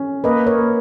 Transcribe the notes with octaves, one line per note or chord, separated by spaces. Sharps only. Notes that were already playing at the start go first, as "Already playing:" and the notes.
Already playing: C#4
A#3 B4 D#5
A#4 C#5
A#3